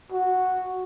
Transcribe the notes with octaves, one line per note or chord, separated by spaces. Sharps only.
F#4